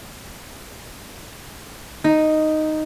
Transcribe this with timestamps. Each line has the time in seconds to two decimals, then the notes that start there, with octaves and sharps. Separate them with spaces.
2.04 D#4